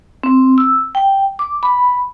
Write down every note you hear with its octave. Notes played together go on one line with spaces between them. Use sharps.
C4
E6
G5
D6
B5